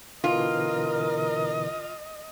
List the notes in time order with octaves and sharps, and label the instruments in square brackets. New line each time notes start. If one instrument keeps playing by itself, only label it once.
[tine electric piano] B2 D3 E3 [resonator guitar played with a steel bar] F4 [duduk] A#4 [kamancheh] D#5